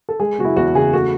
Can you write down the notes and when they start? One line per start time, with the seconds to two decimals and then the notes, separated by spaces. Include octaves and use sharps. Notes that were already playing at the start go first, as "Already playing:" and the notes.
0.09 A4
0.20 G#3 G#4
0.39 F#1 F#4
0.45 E4
0.56 E2 F#4
0.75 C#3 G#4
0.93 A3 F#4